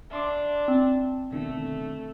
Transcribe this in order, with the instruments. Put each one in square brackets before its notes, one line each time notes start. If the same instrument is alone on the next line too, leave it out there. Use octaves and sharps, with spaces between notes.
[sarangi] D4 [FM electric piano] E5 C6 D6
[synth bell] C4
[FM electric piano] B2 D3 D#3 [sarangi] A3